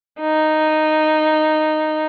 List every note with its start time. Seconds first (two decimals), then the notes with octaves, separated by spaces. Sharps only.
0.20 D#4